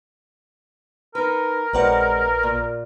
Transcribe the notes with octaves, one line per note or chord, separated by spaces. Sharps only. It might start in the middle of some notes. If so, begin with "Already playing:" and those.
D#4 A#4 B4
A#1 G#3 C4 B4 D5 F#5
A#2